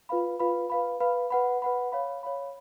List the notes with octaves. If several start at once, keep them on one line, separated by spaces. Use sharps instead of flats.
F4 B4 F5 B5
F4 B4 F5 B5
B4 F5 B5
B4 F5 B5
B4 F#5 B5
B4 F#5 B5
C#5 F5 B5
C#5 F5 B5